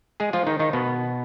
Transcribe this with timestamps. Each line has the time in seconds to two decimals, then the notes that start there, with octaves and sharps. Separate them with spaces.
0.20 G#3 G#4
0.33 F3 F4
0.47 D#3 D#4
0.59 D#3 D#4
0.73 B2 B3